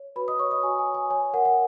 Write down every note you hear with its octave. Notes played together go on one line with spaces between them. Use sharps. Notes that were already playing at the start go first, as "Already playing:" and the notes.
Already playing: C#5
F#4 B4 B5
D#5 D#6
C#5 C#6
D#5 D#6
F#4 G#5
G#5
C#5
G#5
C#5 G#5
A#4 F#5
F#5